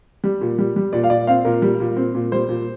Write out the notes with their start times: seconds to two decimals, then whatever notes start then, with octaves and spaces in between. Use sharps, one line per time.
0.24 G3
0.41 A#2
0.59 G3
0.76 G3
0.93 A#2 D5
1.03 F5
1.10 A#2 D5
1.27 C4 F5
1.45 A#2 A#4
1.62 G3
1.80 A#2
1.97 C4
2.15 A#2
2.32 G3 C5
2.49 A#2